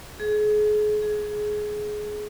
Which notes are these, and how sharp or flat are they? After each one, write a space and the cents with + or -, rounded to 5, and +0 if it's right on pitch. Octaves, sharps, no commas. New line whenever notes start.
G#4 +30
G#4 +15